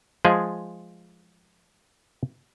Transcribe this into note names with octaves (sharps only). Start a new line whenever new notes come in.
F3 G#3 G#4